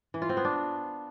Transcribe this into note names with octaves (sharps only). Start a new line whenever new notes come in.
E3
F4
C4
B3
D4